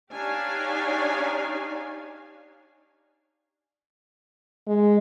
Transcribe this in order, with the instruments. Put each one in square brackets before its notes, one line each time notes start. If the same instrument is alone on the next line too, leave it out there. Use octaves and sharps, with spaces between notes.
[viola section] D4 D#4 G4 C#5 F5 G#5
[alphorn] G#3